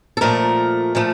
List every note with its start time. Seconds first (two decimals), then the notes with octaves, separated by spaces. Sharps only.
0.17 A4
0.21 A#2 F3 A3 A#4
0.95 A#2 F3 A3